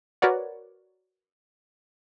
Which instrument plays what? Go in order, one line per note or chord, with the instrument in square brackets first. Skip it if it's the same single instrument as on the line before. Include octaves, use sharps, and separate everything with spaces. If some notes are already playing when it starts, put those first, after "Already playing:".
[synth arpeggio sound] F#4 A#4 B4 C#5 D5 F#5